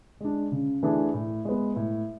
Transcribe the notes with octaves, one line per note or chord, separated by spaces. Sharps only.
G#3 D4
C#3
E3 A3 D4 G#4
A2
G#3 B3
A2